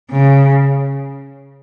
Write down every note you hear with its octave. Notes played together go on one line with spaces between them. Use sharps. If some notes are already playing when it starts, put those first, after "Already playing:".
C#3